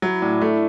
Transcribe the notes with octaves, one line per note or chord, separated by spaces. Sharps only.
F#3 E4
A2 D4
A3 E4